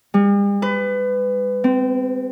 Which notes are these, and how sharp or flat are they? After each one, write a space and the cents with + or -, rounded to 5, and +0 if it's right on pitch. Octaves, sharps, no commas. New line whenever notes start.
G3 +45
B4 +25
C4 -25